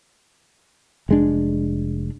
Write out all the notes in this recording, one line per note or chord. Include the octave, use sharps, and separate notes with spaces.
F1 G#3 D4